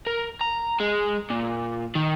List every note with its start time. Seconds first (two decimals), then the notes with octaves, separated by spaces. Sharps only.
0.07 A#4
0.41 A#5
0.80 G#3
1.30 A#2
1.95 D#3